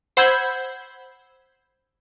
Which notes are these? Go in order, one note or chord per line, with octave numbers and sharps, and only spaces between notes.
C5 F#5 B5 E6 G6 G#6